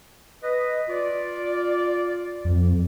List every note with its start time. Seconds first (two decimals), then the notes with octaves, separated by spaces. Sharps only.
0.43 B4 D#5
0.89 F4 D5
2.45 F2